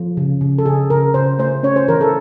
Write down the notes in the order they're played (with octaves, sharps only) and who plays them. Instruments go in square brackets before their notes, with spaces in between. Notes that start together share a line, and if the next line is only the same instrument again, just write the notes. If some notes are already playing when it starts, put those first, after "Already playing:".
Already playing: [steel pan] F3
C#3
C#3
A4
C#3 G#4
C#3 A#4
C#3 C5
A3 C5
C#4 C#5
C5
E3 A#4
A4